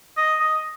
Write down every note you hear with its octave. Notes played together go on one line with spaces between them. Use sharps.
D#5
D#5